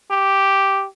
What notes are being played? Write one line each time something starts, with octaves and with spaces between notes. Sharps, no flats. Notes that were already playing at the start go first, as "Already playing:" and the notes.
G4